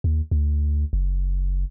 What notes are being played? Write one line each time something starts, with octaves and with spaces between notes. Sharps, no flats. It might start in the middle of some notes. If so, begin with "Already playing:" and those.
D#2
D2
F#1